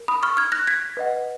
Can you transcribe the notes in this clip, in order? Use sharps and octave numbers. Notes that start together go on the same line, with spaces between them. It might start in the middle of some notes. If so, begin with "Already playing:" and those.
Already playing: A#4
B5 D#6
C#6 F6
F6 G#6
F#6 A#6
G#6 B6
B4 D#5 F#5